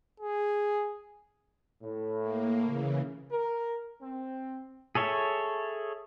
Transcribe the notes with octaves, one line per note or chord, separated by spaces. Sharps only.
G#4
A2
A#3
C#3 E3
A#4
C4
G#4 A4 C#5 E5